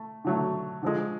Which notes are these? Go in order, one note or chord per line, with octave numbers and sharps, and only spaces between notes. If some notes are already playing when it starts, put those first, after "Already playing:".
Already playing: A3
D3 F#3 A3
D3 F3 G#3